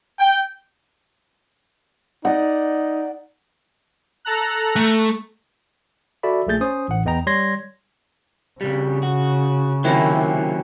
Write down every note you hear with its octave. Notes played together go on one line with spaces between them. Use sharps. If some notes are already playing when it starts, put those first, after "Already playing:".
G5
D#4 D5 F#5
A4 A#5 F#6
A3
F#4 A4 D5 E5 B5
A#1 A#2 A3 G#4 G6 A6
C#4 C5 D#6
A1 F#5
E2 B3 D#5 G5 A#5
G3 C#5 C6 G#6 A#6
F2 C#3 G3
F#4
C3 D#3 F#3 A#3 C#4 E4